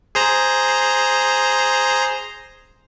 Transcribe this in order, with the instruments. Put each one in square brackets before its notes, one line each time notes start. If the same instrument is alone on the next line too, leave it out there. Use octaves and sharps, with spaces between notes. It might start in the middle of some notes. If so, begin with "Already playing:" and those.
[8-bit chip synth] G#4 C5 A#5